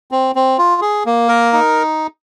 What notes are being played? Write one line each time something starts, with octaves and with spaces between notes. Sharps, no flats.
C4
C4
F4
G#4
A#3
A#4
D#4